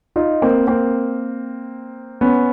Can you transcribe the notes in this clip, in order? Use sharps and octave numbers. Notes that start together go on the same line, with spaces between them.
D#4 F4
A#3 C4
A#3 C4
B3 C#4